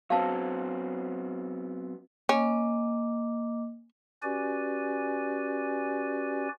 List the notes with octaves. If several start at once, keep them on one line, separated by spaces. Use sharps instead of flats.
F#3 B3 C4 F5 A5
A#3 C#4 D#5 D6
C#4 F#4 G4 B4 D5 G#5